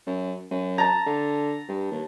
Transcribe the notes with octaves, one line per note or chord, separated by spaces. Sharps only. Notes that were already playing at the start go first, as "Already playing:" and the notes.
F#2
F#2
A5 A#5
D3
G2
D#2